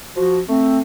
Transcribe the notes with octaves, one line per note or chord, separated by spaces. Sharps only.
F3 F#4
A3 C4